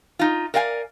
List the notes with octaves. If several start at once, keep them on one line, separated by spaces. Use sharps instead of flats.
D#4 F4
A#4 D5 F5 G5 G#5